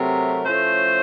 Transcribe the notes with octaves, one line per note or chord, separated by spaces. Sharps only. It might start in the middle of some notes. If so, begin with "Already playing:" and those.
Already playing: C3 F#3 A3 A#4
A2 F3 A3 C#4 C5